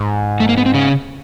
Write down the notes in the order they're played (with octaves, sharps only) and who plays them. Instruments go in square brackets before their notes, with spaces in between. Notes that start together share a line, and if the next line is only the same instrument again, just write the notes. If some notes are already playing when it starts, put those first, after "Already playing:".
Already playing: [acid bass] G#2
[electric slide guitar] A3
A#3
B3
C4
C#3 C#4